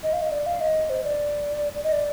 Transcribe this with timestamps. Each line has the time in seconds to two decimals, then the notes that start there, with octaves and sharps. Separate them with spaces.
0.03 D#5
0.13 F5
0.22 D#5
0.32 D5
0.46 F5
0.61 D#5
0.90 C5
1.04 D5
1.75 D5
1.84 D#5
1.92 D5